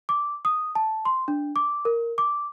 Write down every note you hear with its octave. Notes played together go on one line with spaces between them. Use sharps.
D6
D#6
A5
C6
D4
D6
A#4
D6